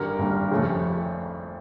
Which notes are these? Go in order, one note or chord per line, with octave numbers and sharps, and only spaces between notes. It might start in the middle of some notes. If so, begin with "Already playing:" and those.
Already playing: G#1 G2 D3 G3 A#4
G#1 G2 D3 G3
F2 C#3 F3 A3 C#4